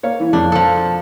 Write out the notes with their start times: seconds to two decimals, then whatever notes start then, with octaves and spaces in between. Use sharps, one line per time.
0.03 A#3 C#5 F5
0.20 E3
0.33 F2 D4
0.52 F3 A4